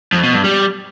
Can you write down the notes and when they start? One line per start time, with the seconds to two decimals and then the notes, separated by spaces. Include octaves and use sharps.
0.13 F2
0.23 B2
0.33 G2
0.44 G3